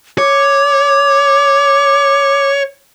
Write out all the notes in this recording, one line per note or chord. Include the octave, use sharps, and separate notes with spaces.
C#5 D6